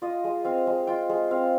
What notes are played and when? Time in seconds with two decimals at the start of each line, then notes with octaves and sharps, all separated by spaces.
0.02 F4 D#5
0.24 G#3
0.45 C4 F5
0.67 G#3
0.87 F4 G5
1.09 G#3
1.31 C4 F5